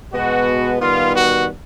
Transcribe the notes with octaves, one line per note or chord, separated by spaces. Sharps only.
B2 G#3 B3 F#4
D#3 G3 B3 F4
F#4